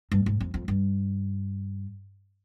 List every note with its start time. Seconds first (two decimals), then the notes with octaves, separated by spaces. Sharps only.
0.12 G2
0.26 G#2
0.40 F2
0.54 F2
0.68 G2